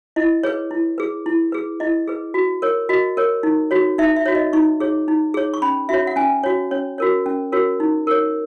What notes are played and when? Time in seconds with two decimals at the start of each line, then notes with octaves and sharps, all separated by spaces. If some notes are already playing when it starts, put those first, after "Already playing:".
0.16 E4 D#5
0.43 G#4 B4 C#5
0.71 E4
0.98 G#4 B4
1.26 E4
1.52 G#4 B4
1.80 E4 D#5
2.07 G#4 B4
2.34 F#4
2.62 A#4 C#5
2.89 F#4 D#5
3.17 A#4 C#5
3.43 D#4
3.71 F#4 C#5
3.98 D#4 E5
4.16 E5
4.26 F#4 C#5
4.35 D#5
4.53 D#4 C#6
4.80 G#4 C#5
5.08 D#4
5.34 G#4 C#5
5.54 C#6
5.62 C#4 B5
5.89 F#4 C#5 E5
6.07 F#5
6.16 C#4 G#5
6.44 F#4 C#5
6.71 C#4 C#5
6.98 F#4 A#4 C#5
7.26 C#4
7.52 F#4 A#4 C#5
7.80 D#4
8.07 A#4 C#5